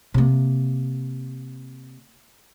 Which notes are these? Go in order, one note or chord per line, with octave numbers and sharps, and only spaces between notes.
C3 A#3